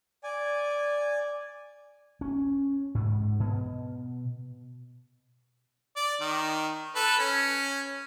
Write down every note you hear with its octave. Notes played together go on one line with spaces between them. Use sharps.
D5 G#5
C#4
G#2
B2
D5
D#3
A4 B4
C#4